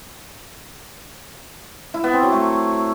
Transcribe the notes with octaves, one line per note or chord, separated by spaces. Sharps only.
E4
B3
C4
F#3
A3